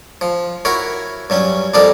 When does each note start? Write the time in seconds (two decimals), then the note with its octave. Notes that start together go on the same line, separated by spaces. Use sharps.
0.21 F3
0.65 E4 F#4 A#4 C#5
1.30 G2 F#3 C#4
1.74 F2 G3 D4 A4 A#4 D#5